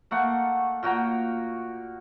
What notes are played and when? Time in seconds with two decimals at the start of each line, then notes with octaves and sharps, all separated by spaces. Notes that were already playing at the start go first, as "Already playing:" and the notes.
0.11 A3 A#3 F#5
0.83 A#2 F#4 G5 A#5